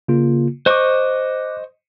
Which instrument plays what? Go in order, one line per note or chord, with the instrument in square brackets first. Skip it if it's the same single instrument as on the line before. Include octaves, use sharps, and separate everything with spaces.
[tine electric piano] C#3 A#3 F4
[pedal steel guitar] C5 D#5 C#6 [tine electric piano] D6 F#6